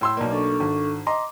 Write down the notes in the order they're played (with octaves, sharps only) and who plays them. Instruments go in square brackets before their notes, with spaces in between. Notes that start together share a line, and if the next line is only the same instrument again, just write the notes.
[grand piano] A2 C6 E6
[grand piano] B1 A#3 [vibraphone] D5
[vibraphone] D4 A4 C#6
[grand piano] G#1
[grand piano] D#5 A#5 C6 [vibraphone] D6